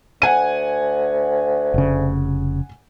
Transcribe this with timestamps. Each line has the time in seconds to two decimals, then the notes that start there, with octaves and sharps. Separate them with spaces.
0.22 D2 F#5 G#5 D#7
1.74 F1 C#3